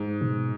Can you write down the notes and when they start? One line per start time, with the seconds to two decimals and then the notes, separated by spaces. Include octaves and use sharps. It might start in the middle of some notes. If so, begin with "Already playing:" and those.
Already playing: G#2
0.21 B2